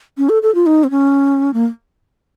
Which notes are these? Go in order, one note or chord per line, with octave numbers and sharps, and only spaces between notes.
C#4
A4
A4
F4
D#4
C4
C#4
A#3